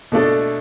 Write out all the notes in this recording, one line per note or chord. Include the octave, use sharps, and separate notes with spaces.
B2 A3 D4 A4